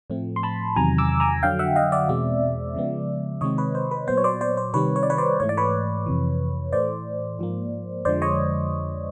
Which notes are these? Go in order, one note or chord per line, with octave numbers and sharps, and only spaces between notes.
A2 F3 A3 C4
C6
A5 B5
E2 C3 D#3 F#3 G#5 A#5
D6 E6
G#5 A#5
F2 D3 F#3 F5 G5
E5 F#5
D#5 F5
D5 E5
E2 B2 G#3 C4
C#3 F3 G#3 B3
C3 D#3 G#3 C4 C#5 D#5
B4 C#5
C5
B4
A#2 F#3 B3 C5
C#5
C5 D5
C5 D5
C5
C3 D#3 G3 C4 B4 C#5
C#5
D5
B4 C#5
C5 D5
G#2 E3 A3 C#5
D5
B4 C#5
F2 C3 E3
A2 E3 A3 C5 D5
G#2 F3 A#3
F2 D3 F3 G#3 C5 D5
C#5 D#5